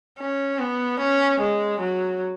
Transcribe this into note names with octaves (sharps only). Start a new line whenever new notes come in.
C#4
B3
C#4
G#3
F#3